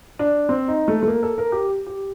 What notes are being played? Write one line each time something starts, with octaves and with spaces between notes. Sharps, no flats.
D4
C4
D#4
A3
A3
A#3
A4
A#4
G4
G4